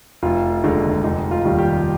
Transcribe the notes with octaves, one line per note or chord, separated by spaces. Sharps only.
F1 F4
D#2 D3 G#3 D#4
F1 D#4
F4
D#2 D#3 G3
G4